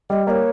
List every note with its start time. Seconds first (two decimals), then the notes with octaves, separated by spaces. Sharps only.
0.10 G3 D#5
0.27 A#3 C#5 D#5